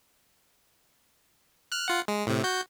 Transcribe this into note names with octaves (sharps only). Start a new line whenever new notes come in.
F6 F#6
F4 F#5
G#3
A2 C3
F#4 G6